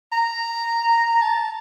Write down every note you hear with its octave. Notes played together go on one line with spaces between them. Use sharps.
A#5
A5